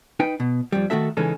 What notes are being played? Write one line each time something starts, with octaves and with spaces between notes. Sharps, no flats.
D#4 B4 G5
B2
F2 G3
D#3 A3 F#4 A4 E5
C#3 E3 G#3 C#4 D#4 A4